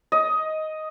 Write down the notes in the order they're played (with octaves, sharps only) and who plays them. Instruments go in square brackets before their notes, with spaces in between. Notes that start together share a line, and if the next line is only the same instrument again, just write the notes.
[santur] D#5